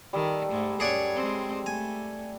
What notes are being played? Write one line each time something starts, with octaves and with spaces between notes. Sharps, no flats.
D#3 G3 A4
G#2 G#3 A3
F#2 G#4 C#5 D5 F#5
G#3 C4
A3 G#5